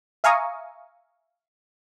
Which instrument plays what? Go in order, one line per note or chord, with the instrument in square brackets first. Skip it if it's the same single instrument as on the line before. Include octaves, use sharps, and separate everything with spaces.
[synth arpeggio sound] E5 F5 G#5 A#5 C#6 D#6